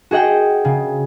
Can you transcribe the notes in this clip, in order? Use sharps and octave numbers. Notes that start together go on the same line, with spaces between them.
F#4 G#4 D#5 F#5 G5
C#3